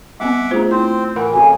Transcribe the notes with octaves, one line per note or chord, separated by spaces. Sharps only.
G3 B3 C4 E5 F#5 D6
A3 D4 F4 G#4 C5
C4 E4 C5 C6
A2 E3 A#4 F#5 B5
F2 C#3 F#4 A4 G#5